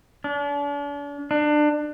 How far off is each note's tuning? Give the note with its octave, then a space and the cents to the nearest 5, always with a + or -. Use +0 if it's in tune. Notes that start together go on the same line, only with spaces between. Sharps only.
D4 -40
D4 +25